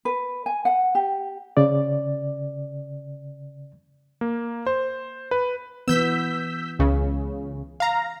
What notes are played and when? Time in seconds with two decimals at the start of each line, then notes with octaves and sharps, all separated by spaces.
0.05 B4
0.46 G#5
0.65 F#5
0.95 G4
1.57 C#3 D5
4.21 A#3
4.66 C5
5.31 B4
5.88 E3 B3 E6 G6 B6
6.79 C#2 C#3
7.80 F5 A#5